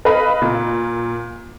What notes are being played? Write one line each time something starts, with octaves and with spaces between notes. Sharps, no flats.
B4 D#5 F5 B5
A#2